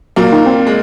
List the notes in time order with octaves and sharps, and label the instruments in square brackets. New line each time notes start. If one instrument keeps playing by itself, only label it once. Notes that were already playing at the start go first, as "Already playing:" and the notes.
[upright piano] A#2 A#3 [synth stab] F#3
[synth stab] D#3
C4
[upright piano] G#3